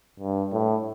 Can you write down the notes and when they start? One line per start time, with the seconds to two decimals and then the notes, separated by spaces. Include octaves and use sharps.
0.20 G2
0.53 A2